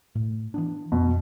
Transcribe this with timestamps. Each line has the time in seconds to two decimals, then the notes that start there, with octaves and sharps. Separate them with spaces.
0.15 A2
0.54 E3 B3 D4
0.92 F2 B2